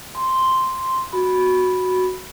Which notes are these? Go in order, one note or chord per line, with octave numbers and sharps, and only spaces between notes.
C6
F#4 B5